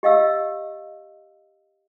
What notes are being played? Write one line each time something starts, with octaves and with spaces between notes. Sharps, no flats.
G4 D#5 F5 E6